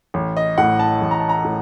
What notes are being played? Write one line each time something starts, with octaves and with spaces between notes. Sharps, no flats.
A1
D#5
A2 F#5
A5
A1
A#5
A5
A#5
A2